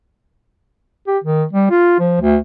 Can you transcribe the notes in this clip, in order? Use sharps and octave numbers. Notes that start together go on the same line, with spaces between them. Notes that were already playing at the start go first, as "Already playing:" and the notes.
G4
D#3
G3
F4
F3
D2